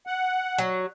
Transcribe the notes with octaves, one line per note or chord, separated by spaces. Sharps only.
F#5
F#3